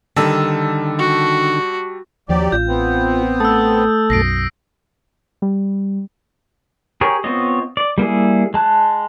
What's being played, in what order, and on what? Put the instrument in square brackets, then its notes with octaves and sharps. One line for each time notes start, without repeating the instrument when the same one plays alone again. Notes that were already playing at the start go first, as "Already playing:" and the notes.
[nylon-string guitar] D3 D#3 [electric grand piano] G3 A5 E6
[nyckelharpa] F#4
[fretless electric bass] D#2 F3 [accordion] F#3 G4 D5
[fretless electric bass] A1 [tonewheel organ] F4 [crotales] G6
[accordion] B3 C4
[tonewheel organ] A3 A4 A5 [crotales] D#6 E6
[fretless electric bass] B1 F#2 [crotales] A#6 C7 D7
[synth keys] G3
[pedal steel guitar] G4 G#4 A#4 C#5
B3 C4 F4 C#5 D#5
D5
G3 A#3 E4 G#4
G#3 A5 F#6